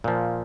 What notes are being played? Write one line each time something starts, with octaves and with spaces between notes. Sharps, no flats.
A#2 F3